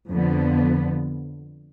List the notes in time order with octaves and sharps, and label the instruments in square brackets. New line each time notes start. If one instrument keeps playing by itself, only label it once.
[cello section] F2 D3 F3 B3